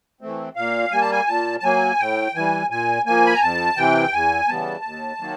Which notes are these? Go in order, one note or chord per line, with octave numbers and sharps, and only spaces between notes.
E3 A3 C4
A#2 F5
G3 A#3 G#5
A5
G#5
A#2 A5
A5
F#3 A#3 G#5
A2 G5
E3 G3 G#5
A#2 G#5
F3 A#3 G#5
B5
A#5
F2 A5
C3 E3 G5
E2 G#5
C#3 E3 G3 B3 A5
D#2
D#3 F#3 A#3